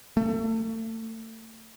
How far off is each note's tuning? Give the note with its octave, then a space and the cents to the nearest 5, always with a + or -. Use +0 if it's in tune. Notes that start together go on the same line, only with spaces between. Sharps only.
A3 +35